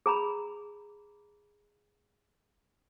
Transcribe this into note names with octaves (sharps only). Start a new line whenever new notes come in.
G#4 A#5 B5